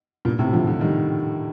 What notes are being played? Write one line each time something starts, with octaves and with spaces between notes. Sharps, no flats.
G2 A#2
A2 C3
D3 F3
D3 F3
D#3 G3